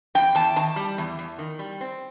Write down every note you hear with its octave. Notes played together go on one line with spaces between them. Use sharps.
E2 G5
E2 A5
D#3 A5
G3
E2
E2
D#3
G3
C4